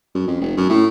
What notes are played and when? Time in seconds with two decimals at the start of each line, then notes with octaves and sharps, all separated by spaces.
0.15 F#2
0.28 F2
0.41 F1
0.57 F#2
0.70 A2